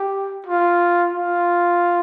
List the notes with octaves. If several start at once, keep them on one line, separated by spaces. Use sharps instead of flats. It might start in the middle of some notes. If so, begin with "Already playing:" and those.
Already playing: G4
F4
F4